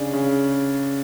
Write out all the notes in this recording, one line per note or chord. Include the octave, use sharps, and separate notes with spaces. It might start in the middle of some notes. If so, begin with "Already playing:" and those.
Already playing: C#3 D4
C#3